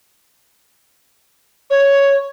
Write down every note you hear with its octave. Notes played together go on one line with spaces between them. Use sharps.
C#5